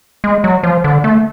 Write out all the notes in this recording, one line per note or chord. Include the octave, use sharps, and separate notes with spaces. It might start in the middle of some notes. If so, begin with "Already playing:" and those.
G#3
F#3
F3
D3
A3